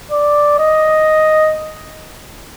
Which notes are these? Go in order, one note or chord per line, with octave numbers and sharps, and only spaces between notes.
D5
D#5